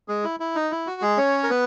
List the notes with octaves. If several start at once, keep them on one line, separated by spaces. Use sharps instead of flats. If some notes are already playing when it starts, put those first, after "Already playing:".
G#3 G#4
E4
E4
D#4
E4
F#4
G#3 G#4
C#4 C#5
A#4
B3 B4